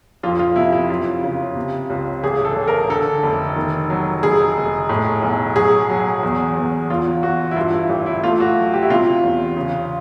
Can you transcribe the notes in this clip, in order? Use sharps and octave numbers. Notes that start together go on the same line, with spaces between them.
F2 F4
F4
C3 E4
E4
F#2 F4
C#3
C3
C#2
A1 G#4
A4
A1
A#4
D3 A4
F1
D#3
F#3
F1 G#4
F1
A2
B1
F#3 G#4
F#3
E2
E2
E2 F4
E2 F#4
E4
G2 F4
E4
A1
E4
A3 F4
F#4
F#3
G4
E4
C3 F4
E2
C#3